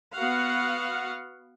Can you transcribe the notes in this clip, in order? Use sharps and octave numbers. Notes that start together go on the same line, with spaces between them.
B3 F#4 F5 F#5